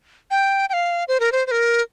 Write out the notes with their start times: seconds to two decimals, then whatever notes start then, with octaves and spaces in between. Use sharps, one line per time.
0.31 G5
0.69 G5
0.73 F5
1.08 C5
1.20 A#4
1.32 C5
1.47 C5
1.51 A#4